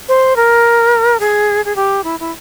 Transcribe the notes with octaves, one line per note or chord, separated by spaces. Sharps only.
C5
A#4
G#4
G#4
G4
E4
E4